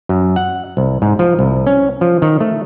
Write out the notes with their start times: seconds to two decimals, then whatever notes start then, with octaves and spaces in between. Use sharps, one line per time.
0.09 F#2
0.36 F#5
0.77 C2
1.02 G#2
1.19 F3
1.39 C2
1.66 C#4
2.01 F3
2.22 D#3
2.40 A3